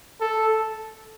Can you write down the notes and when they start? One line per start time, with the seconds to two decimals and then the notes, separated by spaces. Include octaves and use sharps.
0.21 A4